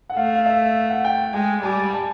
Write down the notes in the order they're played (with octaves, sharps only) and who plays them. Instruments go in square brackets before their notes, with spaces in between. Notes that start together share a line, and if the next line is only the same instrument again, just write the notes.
[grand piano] F#5
[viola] A3 [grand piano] F5
[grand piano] F5
E5
F#5
G5
[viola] G#3 [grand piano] G5
[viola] G3 [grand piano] G#5
[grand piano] A5